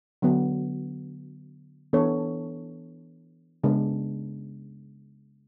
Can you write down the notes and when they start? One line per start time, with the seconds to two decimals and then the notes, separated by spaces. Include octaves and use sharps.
0.22 D3 F#3 B3
1.93 E3 B3 D4 A4 C#5
3.64 C#3 G#3 B3 D4